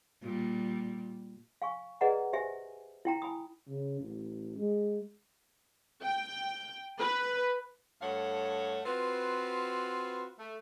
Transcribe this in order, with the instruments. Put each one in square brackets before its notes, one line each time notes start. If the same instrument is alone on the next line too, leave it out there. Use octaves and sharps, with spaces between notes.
[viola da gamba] A#2 G3
[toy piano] F5 G#5 C#6
G#4 B4 D5 D#5 F#5 A#5
G4 C5 E5 G#5
E4 G5 A#5
G#5 B5 D#6
[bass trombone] C#3
A1
G#3
[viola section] G5
B4
[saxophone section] G2 A3 A4 C#5 F5 F#5
C4 F4 F#4 B4
A3